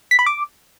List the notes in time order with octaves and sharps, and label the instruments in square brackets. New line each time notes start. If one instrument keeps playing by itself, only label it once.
[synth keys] B6
B5
D6